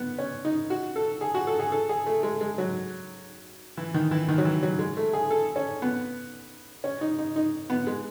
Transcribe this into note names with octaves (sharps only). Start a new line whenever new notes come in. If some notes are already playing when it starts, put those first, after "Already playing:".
Already playing: B3
C#4
D#4
F#4
A4
G#4
F#4
A4
G#4
A4
G#4
A3
G#3
G#3
F#3
E3
D#3
E3
D#3
F#3
E3
F#3
G#3
A3
G#4
A4
C#4
B3
C#4
D#4
D#4
D#4
B3
G#3